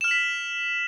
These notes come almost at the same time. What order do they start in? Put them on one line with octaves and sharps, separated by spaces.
E7 F6 F#7 B6